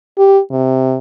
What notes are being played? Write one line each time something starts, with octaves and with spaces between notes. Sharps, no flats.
G4
C3